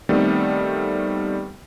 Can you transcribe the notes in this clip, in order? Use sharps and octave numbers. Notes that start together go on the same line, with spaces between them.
D#3 G3 A3 B3 C4 A4